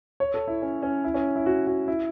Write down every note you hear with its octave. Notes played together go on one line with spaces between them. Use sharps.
C#5
A4
E4
C#4
C#4
E4
C#4
E4
F#4
F#4
E4